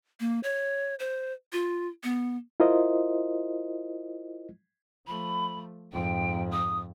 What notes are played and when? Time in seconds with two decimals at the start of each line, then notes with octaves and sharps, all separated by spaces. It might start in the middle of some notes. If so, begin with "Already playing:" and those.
0.20 A#3
0.43 C#5
0.99 C5
1.52 F4
2.03 B3
2.60 E4 F4 A#4 C5 D#5
5.07 F3 A3 B5
5.93 F2 G#2 G5
6.51 D#6